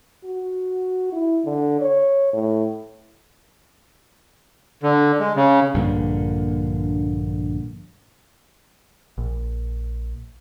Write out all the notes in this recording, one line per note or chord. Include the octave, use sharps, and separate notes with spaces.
F#4
E4
D3
C#5
A2
D3
G#3
C#3
A#1 G2 D3 A#3
A#1